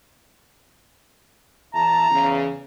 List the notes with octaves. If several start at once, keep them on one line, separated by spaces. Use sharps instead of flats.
E2 E5 A5 A#5
E2 C#3